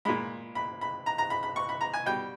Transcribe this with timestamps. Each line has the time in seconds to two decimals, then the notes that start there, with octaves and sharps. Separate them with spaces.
0.05 A#2 G#3 B5
0.55 B5
0.81 B5
1.06 A#5
1.18 A#5
1.30 B5
1.43 B5
1.56 C#6
1.69 B5
1.81 A#5
1.93 G#5
2.05 B2 G3 G5